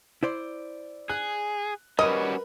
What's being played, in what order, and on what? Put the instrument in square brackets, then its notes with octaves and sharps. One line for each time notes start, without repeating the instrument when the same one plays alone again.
[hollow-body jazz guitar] E4 C5 D5
[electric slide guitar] G#4 [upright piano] F#6
[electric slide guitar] G3 C#4 F#4 [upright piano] A#4 B4 [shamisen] D#5